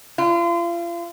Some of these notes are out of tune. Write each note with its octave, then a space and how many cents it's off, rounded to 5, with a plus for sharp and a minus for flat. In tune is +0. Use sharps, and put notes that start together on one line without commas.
F4 -35